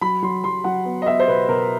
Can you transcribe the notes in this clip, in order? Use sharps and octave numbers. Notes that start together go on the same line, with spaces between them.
F#3 B5
F#3 C6
F#3 C6
F#3 F#5
B3
D#5
B3 E5
C5
B2 B4
B2 A#4